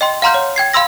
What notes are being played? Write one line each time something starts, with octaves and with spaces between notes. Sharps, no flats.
D#5 G5 C6
F5 F#5 A#5 C6 F6 G6
C#5
G5 G#6 C7
F5 B5 C6 E6 A#6